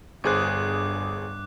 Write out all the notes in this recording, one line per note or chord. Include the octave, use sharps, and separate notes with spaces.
G1 G2 G#4 C5 D6 F#6